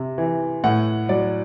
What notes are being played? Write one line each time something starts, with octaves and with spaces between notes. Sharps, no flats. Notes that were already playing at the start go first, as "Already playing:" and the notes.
Already playing: C3
E3
A2 F#5
F#3 D5